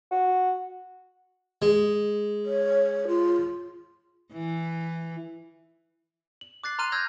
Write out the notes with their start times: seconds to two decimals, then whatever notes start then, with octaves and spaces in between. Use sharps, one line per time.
0.12 F#4
1.62 G#3
2.46 C#5
3.08 F4
4.32 E3
6.41 F#7
6.64 D6 F#6 A6 C7
6.79 A#5 C6 F6 F#6 D#7 F7
6.92 E6 F6 G6 G#6 A#6